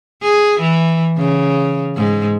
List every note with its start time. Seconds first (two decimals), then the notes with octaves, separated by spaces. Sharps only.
0.23 G#4
0.60 E3
1.18 C#3
1.97 G#2